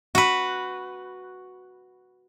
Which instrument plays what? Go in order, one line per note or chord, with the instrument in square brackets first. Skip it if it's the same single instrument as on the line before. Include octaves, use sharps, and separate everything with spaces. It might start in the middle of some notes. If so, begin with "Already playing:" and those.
[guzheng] F#4 B4